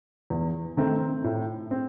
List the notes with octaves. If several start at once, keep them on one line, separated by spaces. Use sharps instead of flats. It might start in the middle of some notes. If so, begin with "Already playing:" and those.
E2
D#3 A3 C4
A2
C4